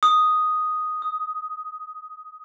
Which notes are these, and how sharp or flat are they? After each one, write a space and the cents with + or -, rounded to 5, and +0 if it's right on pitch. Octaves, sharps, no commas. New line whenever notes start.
D#6 +0
D#6 +20